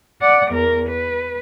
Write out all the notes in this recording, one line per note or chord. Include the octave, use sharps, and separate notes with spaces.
D5 F#5
E2 A#4
B4